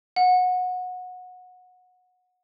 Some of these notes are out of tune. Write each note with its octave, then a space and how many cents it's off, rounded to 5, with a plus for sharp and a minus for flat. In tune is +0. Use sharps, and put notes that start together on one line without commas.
F#5 -20